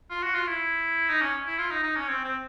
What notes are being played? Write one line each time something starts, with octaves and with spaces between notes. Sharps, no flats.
F4
F#4
F4
E4
D#4
C#4
E4
F4
D#4
D#4
C#4
C4
C4